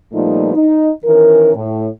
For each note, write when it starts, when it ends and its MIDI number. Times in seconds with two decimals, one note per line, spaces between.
0.13 0.54 46
0.13 0.54 53
0.13 0.54 55
0.13 0.54 57
0.13 0.54 59
0.13 0.54 63
0.54 0.90 63
1.05 1.54 51
1.05 1.54 52
1.05 1.54 61
1.05 1.54 70
1.55 1.87 45